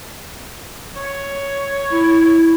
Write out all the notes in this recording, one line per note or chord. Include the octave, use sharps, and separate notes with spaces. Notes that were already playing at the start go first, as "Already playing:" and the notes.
C#5
E4